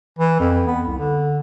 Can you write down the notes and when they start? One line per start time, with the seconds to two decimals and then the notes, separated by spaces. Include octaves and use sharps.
0.19 E3
0.40 F2
0.67 B3
0.87 C2
0.99 D3